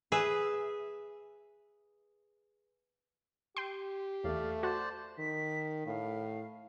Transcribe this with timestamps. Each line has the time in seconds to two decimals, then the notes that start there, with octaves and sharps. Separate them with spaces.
0.12 G#4 B4 E5
3.57 G4 G5 C6
4.24 E2 A3 D5 F5
4.63 F#4 C5 D5 A5
5.19 D#3 B6
5.86 A2 F5